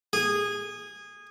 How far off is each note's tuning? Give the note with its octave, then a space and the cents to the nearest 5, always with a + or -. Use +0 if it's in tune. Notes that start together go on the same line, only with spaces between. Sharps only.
G#4 -15